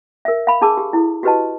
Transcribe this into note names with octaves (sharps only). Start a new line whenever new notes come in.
A#4 E5
F5 B5
D4 G#4 A5 D6 E6
G4
E4 A4
F#4 G4 B4 D#5 A5